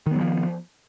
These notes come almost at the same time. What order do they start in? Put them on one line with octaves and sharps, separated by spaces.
D#3 B3 F#3 F3